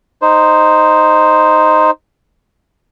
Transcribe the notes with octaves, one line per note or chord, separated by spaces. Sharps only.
D#4 C5